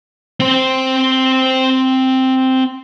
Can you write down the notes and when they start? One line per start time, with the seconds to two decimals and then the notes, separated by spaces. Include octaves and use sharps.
0.40 C4 C5